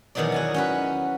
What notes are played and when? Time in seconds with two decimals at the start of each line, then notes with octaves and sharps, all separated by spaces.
0.15 E2 B2 D#3 F#3 D#4 D5
0.32 F#4 G#5 A#5
0.54 C#4 F#4 B4